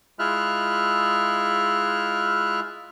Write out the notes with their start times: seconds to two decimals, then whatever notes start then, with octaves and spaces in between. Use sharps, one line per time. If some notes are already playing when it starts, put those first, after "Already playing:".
0.19 G#3 E4 F4 E5 F6 F#6